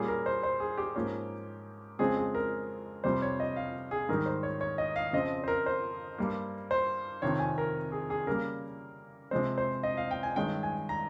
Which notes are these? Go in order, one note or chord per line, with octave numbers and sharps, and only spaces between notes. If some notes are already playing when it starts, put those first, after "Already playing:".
Already playing: A#2 G3 A#3 C#4 G#4
A#4
C5
C5
G#4
G4
G#2 F3 A#3 C#4
F2 C#3 G#3 C4 G#4
G#4
A#4
F2 C3 G3 C5
C#5
D#5
F5
G#4
G#2 D#3 G3 A#4
C5
C#5
C#5
D#5
F5
F2 C#3 F3 C4 D#5
C5
A#4
C5
G2 G3 A#3
C5
F2 C3 D#3 C#5
G#5
A#4
G#4
G#4
C#3 G3 A#3 A#4
C3 F3 G#3 C4 C5
C5
D#5
F5
G5
G#5
G2 D#3 G#3 C#4 G5
G#5
A#5